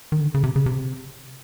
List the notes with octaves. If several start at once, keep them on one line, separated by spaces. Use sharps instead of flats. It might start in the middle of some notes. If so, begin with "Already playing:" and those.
D#3
D3
C#3
C3
C#3
C3